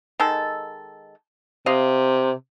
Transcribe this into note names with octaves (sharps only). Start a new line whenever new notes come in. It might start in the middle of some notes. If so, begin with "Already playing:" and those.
D#3 G#3 A4
C3 D#5 F5